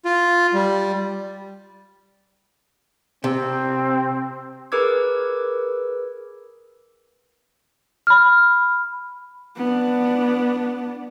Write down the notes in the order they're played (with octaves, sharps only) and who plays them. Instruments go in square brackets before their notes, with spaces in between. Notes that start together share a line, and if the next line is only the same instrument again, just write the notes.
[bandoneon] F4
G3
[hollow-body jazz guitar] C3 [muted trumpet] C4
[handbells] G#4 A#4 B4 D6 E6 G#6
[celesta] B5 F6
[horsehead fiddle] B3 D4